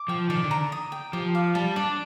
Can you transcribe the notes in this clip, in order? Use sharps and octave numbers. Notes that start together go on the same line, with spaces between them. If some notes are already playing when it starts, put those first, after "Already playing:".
Already playing: D6
F3 G5
D#3 D5
D3
A#5
D#6
G5
F3 G4
F5
G3 A5
D4 D5